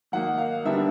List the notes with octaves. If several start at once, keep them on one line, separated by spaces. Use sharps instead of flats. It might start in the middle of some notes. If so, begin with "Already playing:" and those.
D#3 F#3 A#3 D#4 F#5
F5
D3 G3 B3 D4 E5